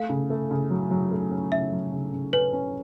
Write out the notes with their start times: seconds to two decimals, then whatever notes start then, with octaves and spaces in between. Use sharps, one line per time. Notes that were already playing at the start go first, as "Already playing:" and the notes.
Already playing: A3 F5
0.09 C#3
0.30 A3
0.51 C#3
0.70 F#3
0.91 F#3
1.11 A3
1.31 C#4
1.52 C#3 E5
1.72 F#3
1.92 C#3
2.12 C#3
2.33 C#4 B4
2.53 C#4